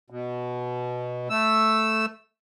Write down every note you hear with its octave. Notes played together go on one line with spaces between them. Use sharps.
B2
A3 E6